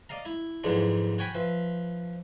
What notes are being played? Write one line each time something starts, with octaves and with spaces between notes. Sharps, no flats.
D5 D#5 F5 A#5
E4
F2 G#2 E3 F#3 G#3 D4
F#4 C#5 G5 G#5 B5
F3 B4 E5